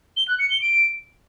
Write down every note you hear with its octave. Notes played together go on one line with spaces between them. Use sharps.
G7
F#6
C#7
G7
D7